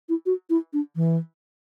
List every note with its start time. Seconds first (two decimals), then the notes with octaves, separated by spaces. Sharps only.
0.09 E4
0.26 F#4
0.50 E4
0.73 D4
0.96 E3